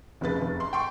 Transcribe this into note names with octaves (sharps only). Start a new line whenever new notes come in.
F1 C#3 B4 A6
F1
C6
G5 C6 C#6